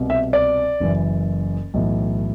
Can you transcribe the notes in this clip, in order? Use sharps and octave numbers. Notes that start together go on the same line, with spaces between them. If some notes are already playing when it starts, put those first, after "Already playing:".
Already playing: C2 B2
E5
D5
F#1 F#2 E3
B1 A2 E3